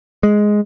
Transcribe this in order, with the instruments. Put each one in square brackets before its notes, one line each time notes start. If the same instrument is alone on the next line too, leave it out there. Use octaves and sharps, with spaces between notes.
[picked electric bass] G#3